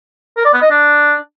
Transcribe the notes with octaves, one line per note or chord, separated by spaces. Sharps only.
A#4
D5
B3
D#5
D4